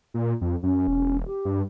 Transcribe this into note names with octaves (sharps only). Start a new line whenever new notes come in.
A#2
F2
F#2 C#4
E1
G4
G2